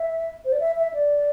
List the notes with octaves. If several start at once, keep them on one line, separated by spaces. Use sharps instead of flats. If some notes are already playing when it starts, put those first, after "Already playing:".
Already playing: E5
C5
D5
E5
E5
D5